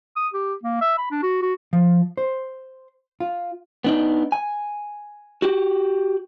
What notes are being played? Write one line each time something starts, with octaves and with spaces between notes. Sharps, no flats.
D#6
G4
A#3
E5
B5
D4
F#4
F#4
F3
C5
F4
B3 D4 D#4
G#5
F#4 G4